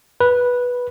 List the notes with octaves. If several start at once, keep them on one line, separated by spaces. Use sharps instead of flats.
B4